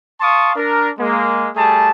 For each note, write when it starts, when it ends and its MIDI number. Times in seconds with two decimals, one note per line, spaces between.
0.20 0.52 77
0.20 0.52 81
0.20 0.52 84
0.20 0.52 85
0.20 0.52 87
0.56 0.91 62
0.56 0.91 70
0.98 1.49 56
0.98 1.49 58
1.56 1.91 55
1.56 1.91 57
1.56 1.91 68
1.56 1.91 81